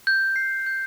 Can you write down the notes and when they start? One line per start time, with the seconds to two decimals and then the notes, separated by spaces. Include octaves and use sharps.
0.07 G6
0.36 C7
0.66 G6